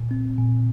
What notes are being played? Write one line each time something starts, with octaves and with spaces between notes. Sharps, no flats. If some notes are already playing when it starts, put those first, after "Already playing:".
Already playing: A#2
C4
A#2